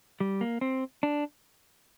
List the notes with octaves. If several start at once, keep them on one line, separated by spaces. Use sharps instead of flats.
G3
A#3
C4
D4